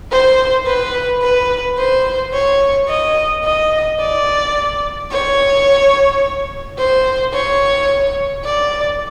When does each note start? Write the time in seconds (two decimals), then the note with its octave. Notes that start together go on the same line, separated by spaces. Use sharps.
0.11 C5
0.66 B4
1.22 B4
1.78 C5
2.33 C#5
2.88 D#5
3.44 D#5
4.00 D5
5.11 C#5
6.78 C5
7.33 C#5
8.44 D5